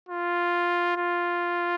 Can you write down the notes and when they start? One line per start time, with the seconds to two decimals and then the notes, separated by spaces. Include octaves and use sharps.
0.09 F4
0.97 F4